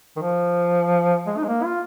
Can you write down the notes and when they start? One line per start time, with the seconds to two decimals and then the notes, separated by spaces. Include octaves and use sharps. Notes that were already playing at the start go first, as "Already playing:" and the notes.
0.17 D#3
0.22 F3
1.27 G#3
1.37 D#4
1.44 G#3
1.48 A#3
1.64 F4